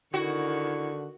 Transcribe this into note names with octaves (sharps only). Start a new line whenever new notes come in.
D3 D#3 E4 F#4 C#6